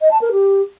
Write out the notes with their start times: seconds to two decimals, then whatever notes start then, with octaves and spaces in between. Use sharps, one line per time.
0.01 D#5
0.11 A5
0.21 A#4
0.32 G4